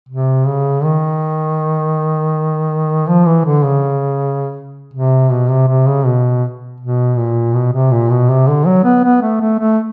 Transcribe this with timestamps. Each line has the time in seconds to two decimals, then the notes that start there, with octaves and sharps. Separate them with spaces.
0.09 C3
0.47 C#3
0.84 D#3
3.07 F3
3.26 E3
3.45 D3
3.63 C#3
4.94 C3
5.31 B2
5.50 C3
5.68 C3
5.87 C#3
6.06 B2
6.80 B2
7.17 A#2
7.54 B2
7.73 C3
7.91 A#2
8.10 B2
8.29 C3
8.48 D3
8.67 F#3
8.84 B3
9.04 B3
9.22 A3
9.41 A3
9.60 A3